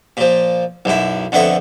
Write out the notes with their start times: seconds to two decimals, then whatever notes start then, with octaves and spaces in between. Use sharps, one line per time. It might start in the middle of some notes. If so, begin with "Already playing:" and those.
0.17 A#2 F3
0.85 B1 F#2 E4
1.32 F2 D3 B3 E5 C#6